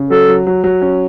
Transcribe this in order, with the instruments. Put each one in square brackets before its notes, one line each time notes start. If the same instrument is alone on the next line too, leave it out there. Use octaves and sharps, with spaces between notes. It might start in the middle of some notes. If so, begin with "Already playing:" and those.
Already playing: [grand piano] C#3
[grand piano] F#3 [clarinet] A4
[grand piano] F#3
F#3
F#3
C#4